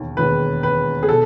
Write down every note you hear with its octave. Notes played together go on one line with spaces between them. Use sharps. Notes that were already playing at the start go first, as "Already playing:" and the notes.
Already playing: E1 D#2 D#3
E1 D#2 D#3 G#3 B4
B4
G#4
B2 A4